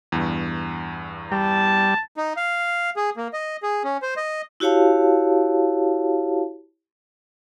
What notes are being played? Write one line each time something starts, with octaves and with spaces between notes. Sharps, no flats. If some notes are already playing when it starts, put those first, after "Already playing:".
E2 G2
G3 A5
D#4
F5
G#4
A#3
D#5
G#4
C#4
C5
D#5
E4 F#4 G4 C#5 F5 A5